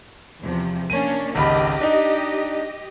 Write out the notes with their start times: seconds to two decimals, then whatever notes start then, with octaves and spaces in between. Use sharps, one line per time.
0.41 E2 C3 F3
0.90 A#3 C#4 D4 D#7
1.35 G#1 C#2 G4 D#5 B5
1.81 D4 D#4